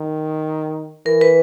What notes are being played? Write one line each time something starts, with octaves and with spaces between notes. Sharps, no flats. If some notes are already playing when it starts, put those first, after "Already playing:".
Already playing: D#3
E3 A#4
B4